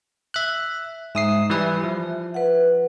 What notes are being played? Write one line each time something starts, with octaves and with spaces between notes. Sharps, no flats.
E5 F#6
G#2 E5 D#6 C7
E3 G3 B4
F3
B4 F#5